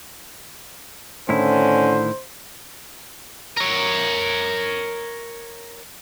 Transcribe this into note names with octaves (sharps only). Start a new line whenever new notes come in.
A2 D3 D#3 C#4 E4 C5
A#4 C#5